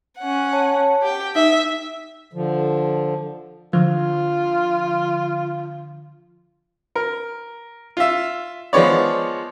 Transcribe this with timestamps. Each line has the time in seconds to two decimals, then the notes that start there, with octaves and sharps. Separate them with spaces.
0.19 C#4 F#5
0.53 C#5 A5
1.02 G4 G5
1.35 D#4 E5
2.33 D3 F3
3.73 D3 F3 F4
6.96 A#4
7.97 F4 E5
8.73 F3 G#3 B3 C#5 D5